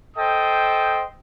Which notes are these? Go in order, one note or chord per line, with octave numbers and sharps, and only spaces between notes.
A4 C5 D#5 G5 D#6